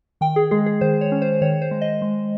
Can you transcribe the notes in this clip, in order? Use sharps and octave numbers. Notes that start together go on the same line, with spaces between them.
D#3 G5
G#4
G#3 G#4
G#4
D#3 C5
C#5
C#4
C5
D#3 C#5
C5
G#3
D#5
G#3